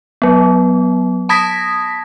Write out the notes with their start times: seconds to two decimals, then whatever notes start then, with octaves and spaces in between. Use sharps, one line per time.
0.22 F#3 B3
1.29 A5 B5 D#6 G#6 A#6 B6